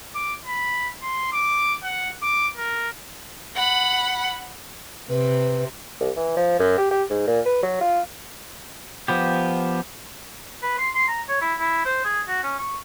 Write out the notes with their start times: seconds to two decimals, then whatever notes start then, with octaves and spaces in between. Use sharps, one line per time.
0.15 D6
0.46 B5
1.02 C6
1.33 D6
1.83 F#5
2.23 D6
2.57 A#4
3.55 F#5 B5
5.09 C3 B4
6.01 C2
6.16 E3
6.37 F3
6.59 F#2
6.78 G4
6.91 G4
7.10 G#2
7.28 A#2
7.46 B4
7.63 F#3
7.81 F4
9.08 F3 B3 G4
10.63 B4
10.78 C6
10.95 C6
11.08 A#5
11.28 C#5
11.41 E4
11.59 E4
11.85 C5
12.05 G#4
12.28 F#4
12.43 C#4
12.59 C#6